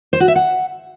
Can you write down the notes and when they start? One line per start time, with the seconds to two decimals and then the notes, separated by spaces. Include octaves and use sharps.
0.13 C5
0.20 F#4
0.28 E5
0.35 F#5